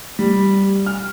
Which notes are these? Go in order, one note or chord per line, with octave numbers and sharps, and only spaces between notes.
G3
F6